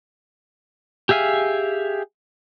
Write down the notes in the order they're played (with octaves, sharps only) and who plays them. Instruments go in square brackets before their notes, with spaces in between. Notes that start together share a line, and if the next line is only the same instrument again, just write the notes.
[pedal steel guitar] G4 G#4 E5 F5 G#5